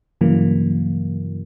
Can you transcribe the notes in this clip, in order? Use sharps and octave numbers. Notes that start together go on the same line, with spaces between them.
G2 C#3 E3 F#3 A#3